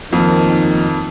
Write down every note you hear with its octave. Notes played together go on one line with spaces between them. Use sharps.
F2 D#3 F3 A#3